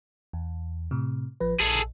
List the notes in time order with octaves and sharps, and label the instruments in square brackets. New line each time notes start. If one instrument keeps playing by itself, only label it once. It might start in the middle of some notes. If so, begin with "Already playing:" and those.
[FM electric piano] E2
A2 C3
A1 F3 B4
[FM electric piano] A#1 [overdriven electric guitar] G#4 A4